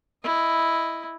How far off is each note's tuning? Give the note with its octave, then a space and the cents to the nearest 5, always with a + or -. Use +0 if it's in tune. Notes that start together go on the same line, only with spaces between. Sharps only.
E4 +0 D#5 +0